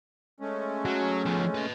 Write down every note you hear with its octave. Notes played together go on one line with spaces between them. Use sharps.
G#3 A3 C#4
F#3
F3 B3
B4 D#5